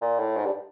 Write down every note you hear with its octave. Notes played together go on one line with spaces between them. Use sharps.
A#2
A2
G#2
G2